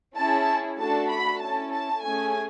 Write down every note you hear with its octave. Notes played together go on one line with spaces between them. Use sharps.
C#4 E4 G#4 A5
A3 D4 F#4 A4 A5
B5
C#4 E4 A4 A5
A5
A3 C#4 G#4 G#5